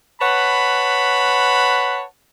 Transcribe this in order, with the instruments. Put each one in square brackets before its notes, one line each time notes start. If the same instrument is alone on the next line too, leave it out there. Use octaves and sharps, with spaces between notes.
[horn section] B4 C#5 F#5 A5 B5